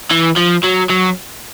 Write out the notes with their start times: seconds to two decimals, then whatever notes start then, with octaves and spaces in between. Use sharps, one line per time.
0.11 E3
0.37 F3
0.64 F#3
0.90 F#3